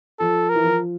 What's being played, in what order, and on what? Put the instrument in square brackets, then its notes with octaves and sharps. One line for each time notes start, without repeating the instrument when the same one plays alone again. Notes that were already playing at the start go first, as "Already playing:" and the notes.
[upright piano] F3 [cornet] A4
[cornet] A#4
[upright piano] E3
F3